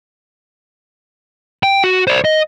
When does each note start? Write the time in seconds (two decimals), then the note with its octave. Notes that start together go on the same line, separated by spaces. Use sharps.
1.63 G5
1.84 F#4
2.07 C5 D5
2.25 D#5